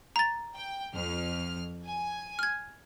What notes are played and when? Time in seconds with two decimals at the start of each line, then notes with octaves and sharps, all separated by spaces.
0.16 A#5 A6
0.55 G5
0.94 F2 F6
1.86 G#5
2.39 F6 G#6